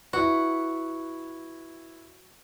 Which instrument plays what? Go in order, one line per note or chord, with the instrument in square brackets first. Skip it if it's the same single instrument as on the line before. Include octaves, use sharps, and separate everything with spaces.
[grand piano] E4 B4 [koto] F#4